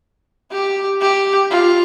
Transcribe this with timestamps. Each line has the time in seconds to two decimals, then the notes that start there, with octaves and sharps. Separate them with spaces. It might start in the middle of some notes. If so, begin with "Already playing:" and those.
0.52 G4
1.01 G4
1.50 F4